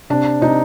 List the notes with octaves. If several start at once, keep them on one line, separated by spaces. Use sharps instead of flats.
C3 D4
C3 D#4